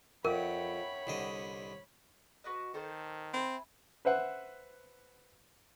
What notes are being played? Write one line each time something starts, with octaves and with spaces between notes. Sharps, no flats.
F2 A#4 C#5 E5 F#5 G5 B5
C2 D3 D#5
F#4 B4 D#5
D#3 A4 C5 A5
C4 E5 G#5 B5
B4 C5 E5 F#5